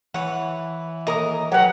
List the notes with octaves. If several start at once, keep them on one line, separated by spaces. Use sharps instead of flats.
E3 B4 C#5 F#5
D#2 A#4 D#5 A#5 D#6
F#3 G4 A#4 B4 C#5 F#5